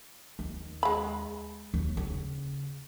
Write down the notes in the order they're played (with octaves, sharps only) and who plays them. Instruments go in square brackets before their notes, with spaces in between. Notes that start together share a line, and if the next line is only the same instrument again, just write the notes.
[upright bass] D#2
[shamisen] G#3 B5
[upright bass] D#2
C#3